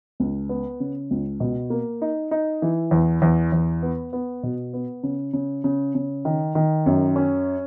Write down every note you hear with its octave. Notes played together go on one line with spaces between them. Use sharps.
C#2
B3
C#3
C#2
B2
A#3
D#4
D#4
E3
E2
E2
E2
B3
B3
B2
B3
C#3
C#3
C#3
C#3
D#3
D#3
F#2
C#4